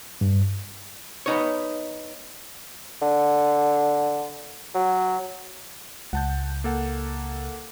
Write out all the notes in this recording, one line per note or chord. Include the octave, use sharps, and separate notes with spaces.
G2
B3 D#4 C#5
D3
F#3
C#2 F#5 A5 G6
A#3 A4 F#5